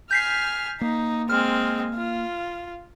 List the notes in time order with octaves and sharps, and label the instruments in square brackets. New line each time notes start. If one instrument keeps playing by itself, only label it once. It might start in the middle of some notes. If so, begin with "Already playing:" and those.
[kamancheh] G#5 F6 [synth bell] G6 B6 C7
[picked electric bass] A#3 [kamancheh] D#4
[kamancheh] G#3 C4 [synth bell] F6
[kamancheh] F4